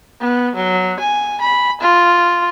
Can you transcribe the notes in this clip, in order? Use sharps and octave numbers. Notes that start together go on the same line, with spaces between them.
B3
F#3
G#5
B5
F4